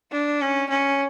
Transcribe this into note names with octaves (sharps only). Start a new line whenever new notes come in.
D4
C#4
C#4